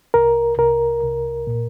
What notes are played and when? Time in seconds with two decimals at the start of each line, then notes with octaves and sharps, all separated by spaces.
0.14 C2 A#4
0.58 C2 A#4
1.03 C2
1.47 A#2